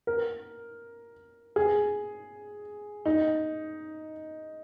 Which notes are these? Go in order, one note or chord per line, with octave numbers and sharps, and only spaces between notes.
A#4
G#4
D#4